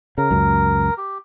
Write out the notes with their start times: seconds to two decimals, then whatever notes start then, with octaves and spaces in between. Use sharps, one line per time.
0.18 C#3 A#4
0.31 C#2 F#2
0.98 G4